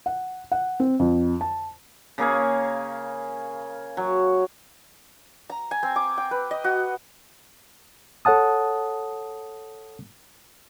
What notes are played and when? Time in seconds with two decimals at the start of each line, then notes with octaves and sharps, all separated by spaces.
0.06 F#5
0.52 F#5
0.80 C4
0.99 F2
1.41 A5
2.18 C#3 A#3 G#4 F5
3.97 F#3
5.50 A#5
5.71 G#5
5.83 C4
5.96 D6
6.18 G5
6.31 B4
6.51 D#5
6.64 F#4
8.25 A4 C#5 F#5 A5 D#6